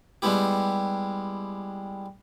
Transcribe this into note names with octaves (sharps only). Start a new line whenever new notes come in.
G3 G#3 B3 E4 G4